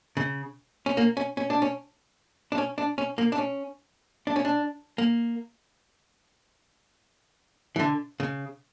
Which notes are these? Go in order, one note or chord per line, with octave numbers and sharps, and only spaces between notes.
C#3
C#4
A#3
C#4
C#4
D4
C#4
D4
C#4
D4
C#4
A#3
D4
C#4
D4
C#4
D4
A#3
E3
D3
C#3